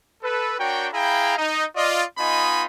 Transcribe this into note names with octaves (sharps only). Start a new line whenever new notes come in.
A4 B4
D4 F#4 A#4 C#5 G5
E4 G#4 F5 G5 A#5 B5
D#4
F4 D5 D#5
B3 D#4 F4 D#5 G#5 B5